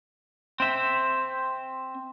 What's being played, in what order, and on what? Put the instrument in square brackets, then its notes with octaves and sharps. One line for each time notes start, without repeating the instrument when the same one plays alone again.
[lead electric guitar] C4 E5